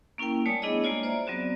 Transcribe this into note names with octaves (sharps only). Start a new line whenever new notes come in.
A#3 C#4 E4 A#4 G5
G3 A3 C#5 D5 G#5 D#6
B3 D4 E4 G#4 C#5 D#5
G#3 A#3 D4 F4 C#5 D5
C5 D5 E5 A#5
F#3 B3 C4 F#4 D5